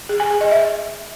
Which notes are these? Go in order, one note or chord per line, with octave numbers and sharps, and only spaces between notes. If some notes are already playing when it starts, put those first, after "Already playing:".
G#4
G#5
G#4
D#5
E5